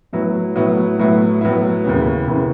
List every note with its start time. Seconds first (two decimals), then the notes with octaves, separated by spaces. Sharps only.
0.13 A2 F#3 B3 E4
0.56 A2 F#3 B3 E4
0.99 A2 F#3 B3 E4
1.41 A2 F#3 B3 E4
1.84 D#2 C#3 E3 B3
2.27 D#2 C#3 E3 B3